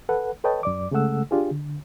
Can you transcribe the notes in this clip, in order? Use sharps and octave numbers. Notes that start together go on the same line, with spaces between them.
A4 B4 F#5
A4 B4 C#5 D#5 G5 A5
F#2 D5 D6
C#3 G#3 A3 A4 F#5 E6
D4 F4 G4 G#4
D3